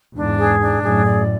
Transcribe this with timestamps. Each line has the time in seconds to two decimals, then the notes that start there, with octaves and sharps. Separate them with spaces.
0.15 E2 G#2 D4
0.37 G#4
0.60 D4
0.82 F#2 A2 G#4
1.05 D5